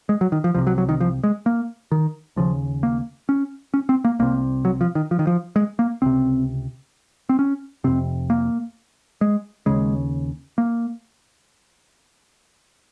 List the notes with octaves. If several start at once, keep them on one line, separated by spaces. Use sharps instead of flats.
G#3
F#3
D#3
F3
C2 C3 F3
F#3
F#3
D#3
F3
G#3
A#3
D#3
D#2 C#3 F3
A#3
C#4
C#4
C4
A#3
C2 C3 A#3
F#3
F3
D#3
F3
D#3
F3
G#3
A#3
C#2 C3 C4
C4
C#4
F2 C3 C4
A#3
G#3
D#2 C#3 G#3
A#3